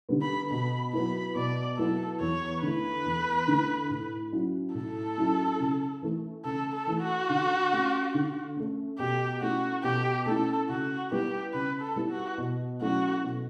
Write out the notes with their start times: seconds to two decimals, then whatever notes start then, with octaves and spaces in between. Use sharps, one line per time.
0.09 D3 G3 B3
0.22 B5
0.50 B2 B5
0.93 F#3 B3 E4 B5
1.35 B2 D5
1.77 F#3 B3 E4 A4
2.20 E2 C#5
2.62 D3 A3 E4 B4
3.05 E2
3.48 D3 A3 E4
3.90 A2
4.33 F#3 C#4 E4
4.75 A2 A4
5.17 F#3 C#4 E4
5.60 C#3
6.02 E3 A3
6.45 C#3 A4
6.73 A4
6.87 E3 A3
7.01 F#4
7.29 D3
7.72 A3 C#4
8.14 D3
8.57 A3 C#4
8.99 B2 G4
9.41 A3 C#4 E4 F#4
9.83 B2 G4
10.26 A3 C#4 E4 A4
10.69 C#3 F#4
11.11 G3 B3 E4 G4
11.53 C#3 B4
11.82 A4
11.96 G3 B3 E4
12.10 F#4
12.38 B2
12.81 F#3 A3 C#4 E4 F#4
13.24 B2